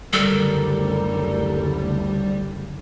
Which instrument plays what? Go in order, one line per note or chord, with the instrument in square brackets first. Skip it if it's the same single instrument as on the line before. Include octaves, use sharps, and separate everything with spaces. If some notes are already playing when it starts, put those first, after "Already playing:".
[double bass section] F#1 D2 D3 [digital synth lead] G3 [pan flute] A4 [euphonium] A#4